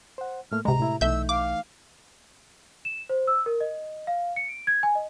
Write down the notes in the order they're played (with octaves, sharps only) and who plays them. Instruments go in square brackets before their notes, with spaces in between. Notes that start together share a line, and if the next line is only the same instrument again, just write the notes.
[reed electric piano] C5 F#5
[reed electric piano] A2 A3 A#3 [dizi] F6
[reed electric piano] C#2 G#2 [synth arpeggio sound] C3 G#3 [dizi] A#5
[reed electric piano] A2 E4 E5
[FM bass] B1 [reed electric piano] E3 A3 D#4 [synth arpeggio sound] E5 G6 [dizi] E6
[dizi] F5 [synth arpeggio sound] D6
[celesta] E7
C5
E6
A#4
D#5
F5
C#7
D7
G#6
G#5
D#5